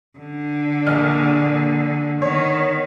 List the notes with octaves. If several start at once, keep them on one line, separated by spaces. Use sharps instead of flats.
D3
A#1 A#2 F6
D#3 B3 C#5